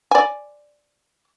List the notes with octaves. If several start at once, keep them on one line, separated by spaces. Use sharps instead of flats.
D5 G#5